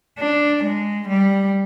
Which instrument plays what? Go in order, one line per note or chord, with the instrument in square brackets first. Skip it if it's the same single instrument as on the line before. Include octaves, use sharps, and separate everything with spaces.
[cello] D4
G#3
G3